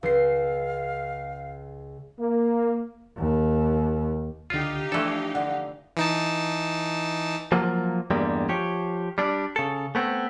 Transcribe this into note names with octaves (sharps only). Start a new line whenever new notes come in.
C#2 F5 C7
A#3
D#2
C#2 D3 D#4 F4 G4 F5
E3 F3 A3 D4 A4
D3 F#5
E3 D#4 A5
F3 F#3 A#3 F4
E2 G2 G3 G#3 A#3
F3 G4 C#5
G3 D4
C#3 A4
A3 B3 C4